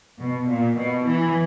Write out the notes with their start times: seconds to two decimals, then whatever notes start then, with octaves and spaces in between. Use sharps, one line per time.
0.19 B2
0.48 A#2
0.77 B2
1.05 E3